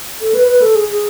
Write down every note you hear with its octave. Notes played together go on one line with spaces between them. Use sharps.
A4
B4
B4
A4
G#4
G#4